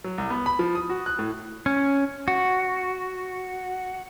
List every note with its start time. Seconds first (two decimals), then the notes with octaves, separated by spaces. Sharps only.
0.04 F#3
0.18 C2
0.30 B3
0.46 B5
0.59 F3
0.75 D#6
0.89 F#4
1.06 F#6
1.19 A2
1.66 C#4
2.28 F#4